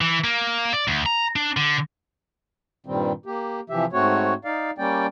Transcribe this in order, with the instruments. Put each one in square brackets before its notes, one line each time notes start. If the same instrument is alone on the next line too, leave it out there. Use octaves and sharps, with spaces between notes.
[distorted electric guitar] E3
A#3
D5
D2
A#5
D4
D3
[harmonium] G2 A#2 D#3 G3 C4
A#3 G4
C3 E3 F3 G4 E5
G#2 A3 C4 F#4 C#5
D#4 D5 F5
G3 A#3 C#4 D5 G5